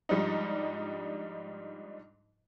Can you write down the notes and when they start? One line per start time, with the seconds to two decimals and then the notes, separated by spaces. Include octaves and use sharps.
0.09 G#2 F3 G3 D4 D#4